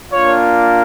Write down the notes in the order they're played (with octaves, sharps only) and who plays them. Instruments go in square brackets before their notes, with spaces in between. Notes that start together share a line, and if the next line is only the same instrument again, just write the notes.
[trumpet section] A#3 D4 F4 C#5